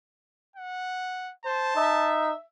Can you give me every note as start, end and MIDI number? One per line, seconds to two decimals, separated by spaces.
0.56 1.33 78
1.45 1.72 72
1.45 2.14 81
1.76 2.32 63
1.76 2.44 76